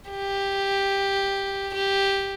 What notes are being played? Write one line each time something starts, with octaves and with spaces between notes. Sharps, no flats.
G4
G4